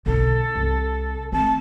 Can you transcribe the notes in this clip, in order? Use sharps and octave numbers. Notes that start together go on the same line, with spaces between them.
B1 D3 A4
C2
A3 C4 A5